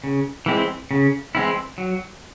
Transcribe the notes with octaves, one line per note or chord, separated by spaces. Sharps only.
C#3
E3 G#3 C4 E4
C#3
E3 G#3 C4 E4
F#3